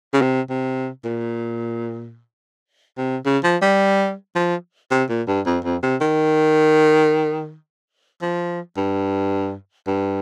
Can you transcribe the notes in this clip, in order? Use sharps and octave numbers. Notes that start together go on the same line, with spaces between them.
C#3
C3
C3
A#2
C3
C#3
F3
G3
F3
C3
A#2
G2
F2
F2
C3
D#3
F3
G2
G2